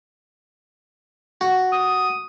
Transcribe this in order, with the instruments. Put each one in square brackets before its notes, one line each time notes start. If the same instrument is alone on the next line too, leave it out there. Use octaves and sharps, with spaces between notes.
[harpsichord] F#4
[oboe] D#6